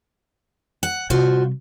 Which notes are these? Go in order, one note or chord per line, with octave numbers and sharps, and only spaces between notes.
F#5
C3 G3 F4 F#4 C5